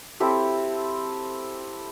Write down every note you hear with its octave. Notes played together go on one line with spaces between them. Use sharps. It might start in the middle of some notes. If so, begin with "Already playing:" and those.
C4 E4 G4 A4